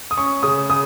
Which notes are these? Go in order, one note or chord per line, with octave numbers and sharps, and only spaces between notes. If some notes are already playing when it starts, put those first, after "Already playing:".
D#6
C#4 C#6
C#3 D#6
C#3 D#6